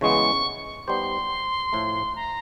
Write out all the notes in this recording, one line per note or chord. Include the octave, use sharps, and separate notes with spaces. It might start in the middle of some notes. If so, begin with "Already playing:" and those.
C#3 E3 G#3 B3 C#6
G3 B3 D#4 G4 C5 C6
A2 F3 A3
A#5